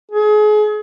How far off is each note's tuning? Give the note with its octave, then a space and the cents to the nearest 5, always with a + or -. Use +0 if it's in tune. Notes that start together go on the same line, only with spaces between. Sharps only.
G#4 +35